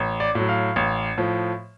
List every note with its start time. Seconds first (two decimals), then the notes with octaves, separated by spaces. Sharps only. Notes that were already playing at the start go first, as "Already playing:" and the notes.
Already playing: A1
0.20 D5
0.35 A2 F#3
0.49 F5
0.76 A1
1.18 A2 F3